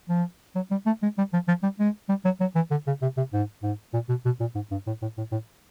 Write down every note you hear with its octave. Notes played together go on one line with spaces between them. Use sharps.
F3
F#3
G3
A3
G#3
G3
F3
F3
G3
G#3
G3
F#3
F#3
E3
D3
C#3
C3
C3
G#2
G#2
A#2
B2
B2
A#2
G#2
G2
A2
A2
A2
A2